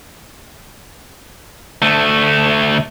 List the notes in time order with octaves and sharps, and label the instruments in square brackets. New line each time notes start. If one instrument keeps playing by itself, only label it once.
[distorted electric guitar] D2 A3